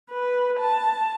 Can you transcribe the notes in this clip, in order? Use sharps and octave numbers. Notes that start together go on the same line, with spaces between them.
B4
A5